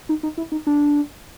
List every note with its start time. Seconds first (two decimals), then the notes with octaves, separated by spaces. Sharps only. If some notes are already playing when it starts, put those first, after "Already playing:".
0.09 D#4
0.23 D#4
0.38 E4
0.52 D#4
0.67 D4